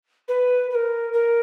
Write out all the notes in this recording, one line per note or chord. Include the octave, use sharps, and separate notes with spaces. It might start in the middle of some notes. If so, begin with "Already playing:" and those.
B4
B4
A#4
A#4